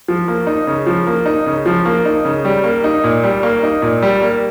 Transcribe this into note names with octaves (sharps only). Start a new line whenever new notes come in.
F3
A#3
D#4
C#3
F3
A#3
D#4
C#3
F3
A#3
D#4
C#3
G3
A#3
D#4
A#2
G3
A#3
D#4
A#2
G3
A#3